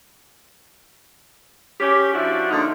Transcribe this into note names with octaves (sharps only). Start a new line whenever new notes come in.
C#4 G4
F3 D4 E4 F#4
D3 F3 A#3 D#4